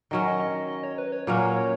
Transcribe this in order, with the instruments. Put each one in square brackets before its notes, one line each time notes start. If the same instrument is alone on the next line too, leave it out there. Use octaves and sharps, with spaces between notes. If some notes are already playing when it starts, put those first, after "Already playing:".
[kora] D#3 F#3 C#4 [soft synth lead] D#5
[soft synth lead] D#5
D#5
D#5
C#5
B4
C#5
[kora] A#2 F#3 A#3 C#4 [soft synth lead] C#5
[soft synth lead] C#5